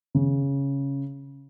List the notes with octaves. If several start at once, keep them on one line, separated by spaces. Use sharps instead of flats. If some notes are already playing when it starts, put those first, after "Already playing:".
C#3